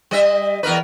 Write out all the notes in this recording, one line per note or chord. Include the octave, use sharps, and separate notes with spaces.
G3 D#5 E5
E2 A#4 B4